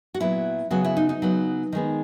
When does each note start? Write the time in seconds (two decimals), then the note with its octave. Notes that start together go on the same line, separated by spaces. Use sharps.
0.14 F#4
0.20 A#2 F#3 B3 E4
0.71 C#3 F#3 B3 F#4
0.84 E4
0.97 D#4
1.09 D#4
1.22 C#3 F#3 B3
1.73 D#3 G#3 B3